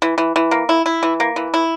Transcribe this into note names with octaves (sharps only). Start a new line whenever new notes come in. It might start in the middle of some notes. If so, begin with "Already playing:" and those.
E3
E3
E3
A#3
E4
E4
E3
A#3
E3
E4